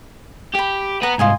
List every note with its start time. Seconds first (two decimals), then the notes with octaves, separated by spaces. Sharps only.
0.55 G4 G5 B5
1.03 B4 F#5 A#5
1.19 C2 G#2 F4 D#5 G#5